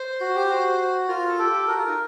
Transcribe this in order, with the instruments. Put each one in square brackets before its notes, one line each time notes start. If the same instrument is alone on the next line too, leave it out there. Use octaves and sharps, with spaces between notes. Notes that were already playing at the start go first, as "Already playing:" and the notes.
Already playing: [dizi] C5
[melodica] F#4
G4
F#4
[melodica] F4 [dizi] A#4
[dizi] A#4
A4
[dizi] G4 [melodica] A4
[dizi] F#4 [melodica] A#4
[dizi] F4
D#4